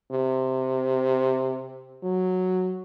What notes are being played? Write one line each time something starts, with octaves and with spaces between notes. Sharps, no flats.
C3
F#3